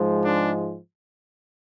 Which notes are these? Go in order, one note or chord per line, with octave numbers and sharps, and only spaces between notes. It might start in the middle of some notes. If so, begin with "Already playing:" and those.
Already playing: G#2 F3 G#3
D4